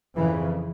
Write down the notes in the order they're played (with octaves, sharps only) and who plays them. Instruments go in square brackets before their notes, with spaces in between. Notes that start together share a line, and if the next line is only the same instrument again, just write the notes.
[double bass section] F2 C#3 E3